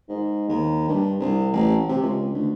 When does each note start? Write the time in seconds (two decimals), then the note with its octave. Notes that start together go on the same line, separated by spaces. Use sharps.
0.09 G#2
0.49 D#2
0.88 G2
1.20 C2
1.52 A1
1.89 C3
2.02 C#2
2.34 D2